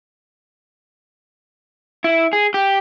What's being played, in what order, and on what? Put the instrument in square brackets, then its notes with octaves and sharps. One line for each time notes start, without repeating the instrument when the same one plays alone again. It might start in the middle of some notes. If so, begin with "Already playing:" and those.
[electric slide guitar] E4
G#4
G4